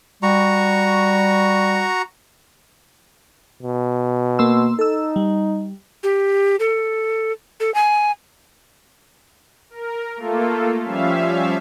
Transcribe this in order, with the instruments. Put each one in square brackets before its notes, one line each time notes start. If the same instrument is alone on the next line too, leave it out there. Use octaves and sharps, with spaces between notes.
[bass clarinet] G3 [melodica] F#4 A#5 C#6
[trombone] B2
[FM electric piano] A#3 C6 E6
[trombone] D#4 [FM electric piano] A4 E6
[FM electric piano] G3
[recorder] G4
A4
A4
G#5
[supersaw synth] A#4
A3 A#3 F4 A4
F3 G3 C#4 E5 F5